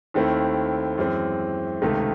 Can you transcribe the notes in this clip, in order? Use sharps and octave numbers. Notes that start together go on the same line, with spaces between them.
D#2 D#3 A3 C4 E4
F#2 E3 G#3 C4
C#2 C3 D#3 A3